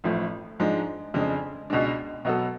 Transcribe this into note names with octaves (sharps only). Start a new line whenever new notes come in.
A1 A2 F3
G#2 F3 G#3 D4
F2 C#3 G#3 D4
C#2 B2 G#3 D4
B2 F#3 B3 F#4 A4